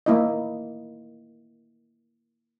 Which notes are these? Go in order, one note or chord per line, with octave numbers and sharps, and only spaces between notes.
A#3 E4 D#5